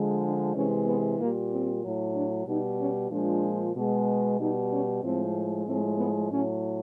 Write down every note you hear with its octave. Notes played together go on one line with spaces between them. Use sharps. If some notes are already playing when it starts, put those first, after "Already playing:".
Already playing: D3 F3 G#3
D4
C3 E3 G#3 C#4
B3
A#2 G3 A#3
C4
A2 F#3
D4
B2 G3 D#4
C#4
A#2 F3 G#3 D4
B2 G#3
B2 G3 D#4
C#4
A2 F3 G#3 C4
A2 F3 G#3 C4
B3
A2 F#3 C#4